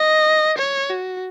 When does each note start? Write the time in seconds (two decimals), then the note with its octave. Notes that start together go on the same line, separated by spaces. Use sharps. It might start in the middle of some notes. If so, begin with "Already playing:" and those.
Already playing: D#5
0.58 C#5
0.90 F#4